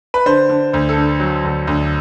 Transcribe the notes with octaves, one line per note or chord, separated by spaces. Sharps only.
B4
D3 C5
D3
D2
A4
D3
F#3
D2
D2